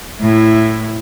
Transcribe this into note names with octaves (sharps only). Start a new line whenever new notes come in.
A2 E4